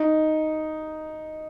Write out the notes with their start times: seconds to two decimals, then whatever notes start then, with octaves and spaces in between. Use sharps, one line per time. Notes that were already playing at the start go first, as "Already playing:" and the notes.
Already playing: D#4